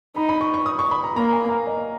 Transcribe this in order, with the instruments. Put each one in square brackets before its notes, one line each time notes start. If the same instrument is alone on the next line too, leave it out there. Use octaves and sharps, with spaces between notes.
[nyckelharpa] D#4 [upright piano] B5
[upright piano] B5
C#6
C#6
D#6
C#6
B5
A#5
[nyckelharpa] A#3 [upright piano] A#5
[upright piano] G#5
F5
D#5